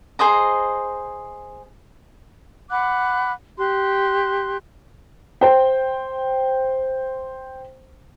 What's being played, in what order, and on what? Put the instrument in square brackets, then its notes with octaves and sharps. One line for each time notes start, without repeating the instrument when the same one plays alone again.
[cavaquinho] G#4 C5 D#5 A#5
[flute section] F#5 B5 D6 F#6
G4 C6 F#6
[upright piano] C5 G5